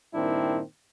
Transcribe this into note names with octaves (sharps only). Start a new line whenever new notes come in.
G2 A#2 D#3 C4 D4 E4